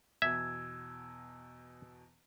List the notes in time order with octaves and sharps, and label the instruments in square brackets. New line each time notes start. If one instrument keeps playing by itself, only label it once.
[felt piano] E2 B2 [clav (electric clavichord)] E5 [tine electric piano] E6 [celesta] G#6